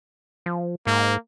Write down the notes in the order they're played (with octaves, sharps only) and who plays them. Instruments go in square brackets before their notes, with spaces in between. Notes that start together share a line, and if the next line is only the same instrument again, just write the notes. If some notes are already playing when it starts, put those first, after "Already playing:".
[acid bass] F3
[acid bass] G#2 [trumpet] A#3